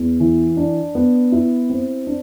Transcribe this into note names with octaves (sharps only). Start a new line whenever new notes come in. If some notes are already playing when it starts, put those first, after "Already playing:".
Already playing: E2
E3
D4
B3
E4
C4
D4